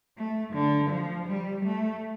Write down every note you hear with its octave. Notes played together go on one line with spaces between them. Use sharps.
A3
D3
F3
G3
A3